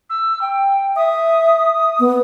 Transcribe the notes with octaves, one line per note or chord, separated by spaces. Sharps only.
E6
G5
E5 D#6
B3